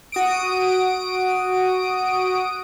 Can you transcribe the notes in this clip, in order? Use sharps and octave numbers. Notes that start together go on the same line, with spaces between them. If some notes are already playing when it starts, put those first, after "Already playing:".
F#4 D#6 D7